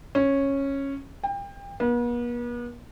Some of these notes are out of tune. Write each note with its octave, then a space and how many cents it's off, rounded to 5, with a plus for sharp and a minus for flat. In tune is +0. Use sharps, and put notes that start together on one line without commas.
C#4 -10
G5 +30
B3 -45